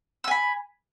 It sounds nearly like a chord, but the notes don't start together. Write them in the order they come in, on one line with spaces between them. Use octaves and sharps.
E6 G#5 B5